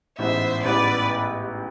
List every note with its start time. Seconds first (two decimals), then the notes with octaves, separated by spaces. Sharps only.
0.19 A1 G#2 E3 B3 C5 E5
0.64 A1 G#2 E3 B3 B4 D5